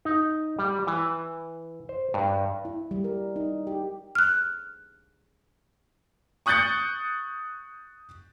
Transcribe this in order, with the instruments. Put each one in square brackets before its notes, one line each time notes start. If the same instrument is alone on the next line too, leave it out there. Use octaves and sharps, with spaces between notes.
[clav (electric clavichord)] D#4
G3
E3
C5
G2
[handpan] E4
G3
A#4
D#4
G4
[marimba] F6 F#6
[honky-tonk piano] C#6 D#6 F#6 G6 A6 C#7